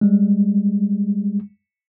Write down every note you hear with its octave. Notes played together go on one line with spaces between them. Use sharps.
G3 G#3